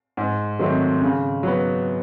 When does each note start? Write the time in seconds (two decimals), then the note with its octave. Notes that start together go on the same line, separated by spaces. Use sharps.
0.17 G#2
0.59 D#3 F#3 A3 C4
1.01 C#3
1.43 F#3 B3